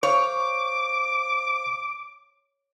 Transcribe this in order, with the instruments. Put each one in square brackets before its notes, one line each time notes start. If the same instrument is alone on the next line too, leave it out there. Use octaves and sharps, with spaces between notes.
[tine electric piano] C5 F5 [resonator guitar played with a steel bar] C#5 [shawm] D6